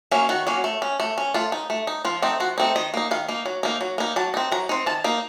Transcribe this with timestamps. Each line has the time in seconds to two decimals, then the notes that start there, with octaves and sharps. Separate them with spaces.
0.11 F#3 A#3 C#4
0.29 D#3 F#4
0.47 F#3 A#3 C#4
0.64 A3
0.82 C#4
1.00 A3
1.18 C#4
1.34 A3 F4
1.52 D#4
1.70 A3
1.87 D#4
2.05 F3 F4
2.22 A3 C4 D#4
2.40 F3 F#4
2.58 A3 C4 D#4
2.76 D#3 D#5
2.94 A#3 D#4
3.11 D#3 F5
3.28 A#3 D#4
3.46 F#3
3.63 A#3 D#4
3.81 F#3
3.98 A#3 D#4
4.16 F#3 A5
4.34 C4 D#4
4.52 F#3 A#5
4.69 C4 D#4
4.86 D#3 A5
5.04 A#3 D#4